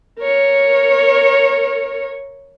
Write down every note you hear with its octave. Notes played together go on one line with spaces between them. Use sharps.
A#4 C#5